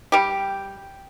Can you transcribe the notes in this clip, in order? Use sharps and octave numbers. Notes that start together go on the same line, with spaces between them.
G3 G4